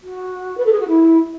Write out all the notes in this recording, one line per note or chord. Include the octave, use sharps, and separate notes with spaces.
F#4
B4
A4
G#4
F#4
E4